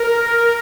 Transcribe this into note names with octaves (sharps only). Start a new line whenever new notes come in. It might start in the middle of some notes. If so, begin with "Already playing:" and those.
Already playing: A#4